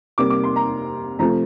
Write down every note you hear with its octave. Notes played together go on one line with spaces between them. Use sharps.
C3 G3 A#3 D6
D6
C6
A#5
C3 F3 A3 A#5